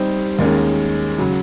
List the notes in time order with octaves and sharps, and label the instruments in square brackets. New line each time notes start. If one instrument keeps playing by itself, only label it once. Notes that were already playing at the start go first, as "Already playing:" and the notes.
Already playing: [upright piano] G3 C4 D#4 G4 C5
D#2 D#3 G#3 C#4
C#3 F#3